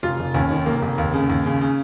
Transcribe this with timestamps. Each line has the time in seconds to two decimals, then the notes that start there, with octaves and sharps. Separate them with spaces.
0.03 F1 F4
0.19 F1
0.34 D#2 C#4
0.50 D#3
0.66 F1 A#3
0.82 F1
0.98 D#2
1.14 C#3
1.29 D#2
1.46 C#3
1.61 C#3